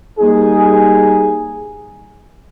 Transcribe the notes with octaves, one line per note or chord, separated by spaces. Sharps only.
G3 A#3 D#4 G#4